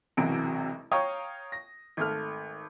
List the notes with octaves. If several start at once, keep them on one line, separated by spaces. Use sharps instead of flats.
E1 A1 C3 E3 F#3 D7
C#5 F5 G5 A#5 C#6 D#6
A#6
G#1 A3 F6